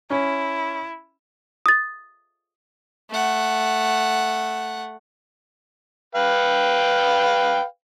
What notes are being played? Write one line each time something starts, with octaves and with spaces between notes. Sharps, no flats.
C#4 E4
D#6 A6
A3 F#5
B4 F5 G5